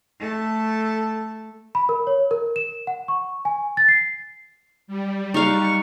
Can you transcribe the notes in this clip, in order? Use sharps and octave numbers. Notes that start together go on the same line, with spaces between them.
A3 A4
B5
A#4
C#5
A#4
E7
F#5
C#6
G#5
A6
C7
G3
D#4 F5 F#5 C#6